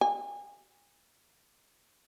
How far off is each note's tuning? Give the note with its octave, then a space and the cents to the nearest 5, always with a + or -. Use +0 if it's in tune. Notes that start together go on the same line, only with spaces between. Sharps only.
G#5 -30